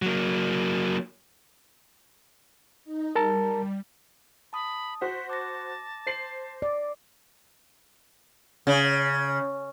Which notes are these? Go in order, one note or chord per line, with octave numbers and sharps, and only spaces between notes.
F#3 A#3
D#4
G3 A#4 A5 A#5
A5 B5 D#6
F#4 C5 F#5 B6
A5 D6 A#6
C5 C7 F#7
D5
C#3